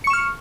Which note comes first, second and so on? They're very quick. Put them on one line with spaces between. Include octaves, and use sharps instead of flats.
C#7 C#6 E7 F6